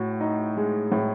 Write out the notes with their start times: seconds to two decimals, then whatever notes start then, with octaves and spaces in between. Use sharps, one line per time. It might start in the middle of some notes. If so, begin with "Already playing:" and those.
Already playing: A2 F#4
0.21 D#4
0.57 G#3
0.92 A2